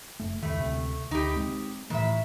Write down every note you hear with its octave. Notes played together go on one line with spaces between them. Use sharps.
F#1 A3
C2 F2 D#3 A3
D2 C3
D2 D#4 G4
G#3 C4
A2 D#3 E3 A3 E5